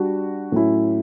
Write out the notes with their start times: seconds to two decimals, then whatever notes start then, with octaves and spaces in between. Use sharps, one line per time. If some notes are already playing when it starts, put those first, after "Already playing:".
Already playing: G3 D4 F#4
0.52 A2 F#3 C#4 E4